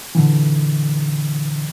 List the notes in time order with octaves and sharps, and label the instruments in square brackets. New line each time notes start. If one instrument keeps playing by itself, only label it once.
[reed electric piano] A#2 D3 E3